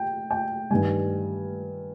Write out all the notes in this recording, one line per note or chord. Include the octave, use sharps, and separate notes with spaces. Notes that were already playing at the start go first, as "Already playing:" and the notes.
Already playing: G5
G5
G2 D#3 G3 G#5